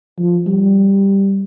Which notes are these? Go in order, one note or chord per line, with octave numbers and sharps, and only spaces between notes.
F3
G3